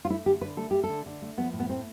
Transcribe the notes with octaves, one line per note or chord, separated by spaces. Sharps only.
F4
A3 E4
D3 G4
D3 B4
A3 A4
A3 G4
A4
D3
D3
A3
F3 B3
A2
B3
A3 C4